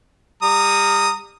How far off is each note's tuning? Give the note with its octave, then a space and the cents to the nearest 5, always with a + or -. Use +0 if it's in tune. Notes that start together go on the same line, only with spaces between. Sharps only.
G3 +30 A#5 -20 D#6 +0